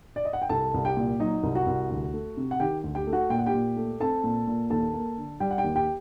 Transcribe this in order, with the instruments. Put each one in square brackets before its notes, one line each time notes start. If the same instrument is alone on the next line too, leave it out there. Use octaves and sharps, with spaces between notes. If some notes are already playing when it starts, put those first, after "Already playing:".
[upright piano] D5
D#5
F#5
G5
C2 A4 A5
C2
G4 G5
A#2
F#3 D#4 D#5
C2
F#4 F#5
C2
D2
A3
C3
F#5
D#3 G4 G5
D2
G4 G5
A3
F#4 F#5
A#2 G5
F#5
G4 G5
A#2
A3
C4 A4 A5
A#2
A#2
D#2 A4 A5
A#3
D3
G3 G4 G5
F#5
G4 G5
D#2
G4 G5